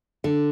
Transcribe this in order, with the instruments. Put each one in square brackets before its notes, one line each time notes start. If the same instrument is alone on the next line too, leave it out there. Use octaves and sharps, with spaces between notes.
[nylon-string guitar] D3 [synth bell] A4